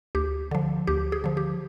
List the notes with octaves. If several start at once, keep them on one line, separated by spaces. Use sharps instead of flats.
D2 G4
D3 F3
D2 G4
G#4
D3 F3
G4